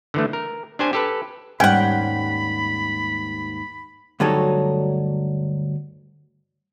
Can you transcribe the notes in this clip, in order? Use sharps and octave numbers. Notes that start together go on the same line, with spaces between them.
D3 E3 A3
A#4
D4 G4 C5 G#5
G4 A4 B4
D#2 G#2 G3 C#4 F#5 G5 B5
D2 G2 F#3 D#4 A4 C#5